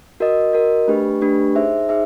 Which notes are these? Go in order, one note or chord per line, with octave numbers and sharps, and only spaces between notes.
F#4 A#4 D#5
F#4 A#4 D#5
A3 D4 G4 B4
A3 D4 G4 B4
D#4 G#4 C5 E5
D#4 G#4 C5 E5